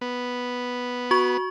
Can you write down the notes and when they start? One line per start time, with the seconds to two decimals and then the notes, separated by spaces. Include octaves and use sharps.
0.01 B3
1.11 F#4 C#6